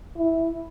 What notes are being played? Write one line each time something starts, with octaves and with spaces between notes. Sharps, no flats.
E4